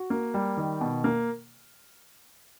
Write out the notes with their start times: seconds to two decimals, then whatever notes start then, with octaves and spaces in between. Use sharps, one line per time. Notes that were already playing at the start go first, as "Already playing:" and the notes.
Already playing: F#4
0.10 A#3
0.34 G3
0.57 D#3
0.81 B2
1.04 A#3